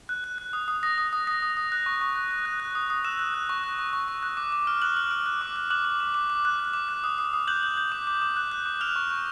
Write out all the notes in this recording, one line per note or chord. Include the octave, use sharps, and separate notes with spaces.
F#6
F#6
F#6
D#6
D#6
D#6 A#6
D#6
D#6
D#6 A#6
D#6
D#6
F#6
C#6
C#6
F#6
F#6
F#6
F#6
D#6
D#6
E6 F#6 E7
F#6
F#6
C#6
F#6
C#6
C#6
C#6
F#6
D6
D6
F6
F6 F#6 F#7
F6
F6
F#6
D6
F#6
D6 F#6 F#7
D6
D6
D6
D6
F#6
F#6
D6
F#6
D#6
D#6
D#6
F#6 G6 F#7
G6
G6
D6
D6
D6
F#6
F#6
D6
F6 F#6 F7
C#6
C#6